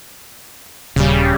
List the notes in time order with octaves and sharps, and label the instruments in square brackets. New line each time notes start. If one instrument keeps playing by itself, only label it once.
[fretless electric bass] D#1 [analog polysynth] C#3 G3